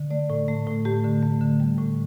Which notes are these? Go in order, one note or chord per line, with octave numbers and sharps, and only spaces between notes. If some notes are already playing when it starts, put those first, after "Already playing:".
Already playing: D3
A3 D5
A2
A3
A2
A3 G4
D3
A3
D3
G3
A2